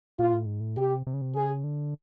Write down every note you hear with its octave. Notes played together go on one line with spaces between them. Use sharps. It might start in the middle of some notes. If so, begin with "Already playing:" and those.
A#2 F4
A2
G#2
A2
C3 G4
C3
C#3
C3
C#3 G#4
D3